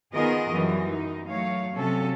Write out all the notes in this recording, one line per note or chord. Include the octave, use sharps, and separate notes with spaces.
D#3 B3 F4 G#4 A#4 D#5
F#2 E3 F#3 G3
D#4
F#3 A3 C#5 F5
C3 F#3 C#4 A4